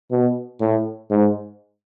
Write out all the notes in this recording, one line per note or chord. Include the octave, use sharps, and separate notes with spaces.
B2
A2
G#2